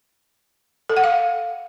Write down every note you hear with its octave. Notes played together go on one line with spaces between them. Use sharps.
A4
F#5
F5